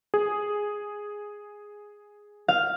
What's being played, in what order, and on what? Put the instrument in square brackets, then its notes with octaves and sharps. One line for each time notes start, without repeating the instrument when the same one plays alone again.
[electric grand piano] G#4
[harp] F5